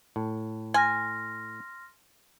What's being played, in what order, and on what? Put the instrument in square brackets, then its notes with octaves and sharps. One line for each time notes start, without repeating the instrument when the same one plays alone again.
[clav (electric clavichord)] A2
[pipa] G#5 [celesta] C6 F6 A#6